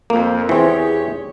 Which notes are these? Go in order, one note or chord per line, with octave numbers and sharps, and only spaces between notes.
F2 A#3
E2 E3 C4 G4 G#4 C#5